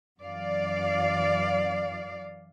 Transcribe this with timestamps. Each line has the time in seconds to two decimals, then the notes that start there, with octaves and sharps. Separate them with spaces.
0.20 F#2 E3 D5 F5